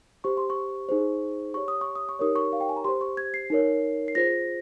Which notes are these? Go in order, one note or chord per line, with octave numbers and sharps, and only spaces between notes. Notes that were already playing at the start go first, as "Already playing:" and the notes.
G4 C5 C#6
C6
C#6
D#4 G#4 C5
G4 C#5 C#6
D#6
C#6
D#6
C#6
D#4 G4 A#4 C#5 D#6
C#6
F5
G5
G#5
A#5
G4 C5 C6
C#6
G#6
C7
D#4 A#4 C#5
C7
F4 G#4 C5 A#6